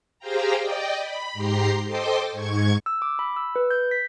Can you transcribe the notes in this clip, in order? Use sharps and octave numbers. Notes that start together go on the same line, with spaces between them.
G4 G#4 C5 F5 G5 A#5
D5 D#5 G5
B5
G#2 G4 A#5 C6 C7
A4 C5 D#5 G5 C6 D6
G#2 C#6 G#6
E6
D6
B5
E6
B4
G6
B6